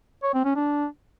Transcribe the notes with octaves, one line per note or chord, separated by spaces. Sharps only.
C#5
C4
C#4
D4